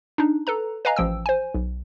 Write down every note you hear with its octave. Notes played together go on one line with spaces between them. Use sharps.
D4 D#4
A4 B4 A#5
B4 D#5 F5 G#5 A#5
A1 F3 G5 E6
C5 G#5
B1